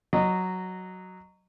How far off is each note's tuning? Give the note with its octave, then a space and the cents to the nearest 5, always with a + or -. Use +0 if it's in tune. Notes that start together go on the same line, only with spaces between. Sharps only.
F#3 +0 D#5 -20